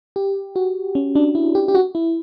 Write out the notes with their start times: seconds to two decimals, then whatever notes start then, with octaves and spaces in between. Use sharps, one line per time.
0.16 G4
0.56 F#4
0.95 C#4
1.15 D4
1.35 E4
1.55 G4
1.68 G4
1.75 F#4
1.95 E4